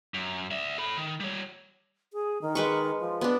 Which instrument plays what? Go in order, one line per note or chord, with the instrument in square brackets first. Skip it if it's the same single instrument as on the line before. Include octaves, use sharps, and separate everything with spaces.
[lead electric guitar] F#2
D5 E5
A4 B5
D#3
G3 C#5
[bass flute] G#4
D#3
[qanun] G#3 B4 C#6
[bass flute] F3
[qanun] B3 D4